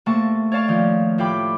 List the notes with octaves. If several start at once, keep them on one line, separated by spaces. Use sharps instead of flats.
C3 A3 A#3 A5 C#6
C#5 D5 F5 A5 C#6
D#3 F3
A2 F4 G4 G5 B5 D6